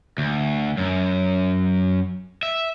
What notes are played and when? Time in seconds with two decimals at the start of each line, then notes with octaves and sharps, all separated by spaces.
0.18 D2
0.77 F#2
2.43 E5